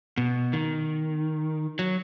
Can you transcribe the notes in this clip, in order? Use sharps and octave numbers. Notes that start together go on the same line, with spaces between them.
B2
D#3
F#3